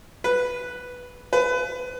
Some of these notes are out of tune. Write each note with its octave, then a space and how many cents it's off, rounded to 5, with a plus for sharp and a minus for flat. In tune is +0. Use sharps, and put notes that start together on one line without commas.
B4 +0
B4 +25